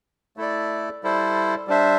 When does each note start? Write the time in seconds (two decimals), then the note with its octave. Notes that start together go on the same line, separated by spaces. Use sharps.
0.37 A3 E4 A4 D5
1.03 G3 E4 A4 C5
1.68 G3 D4 C5 E5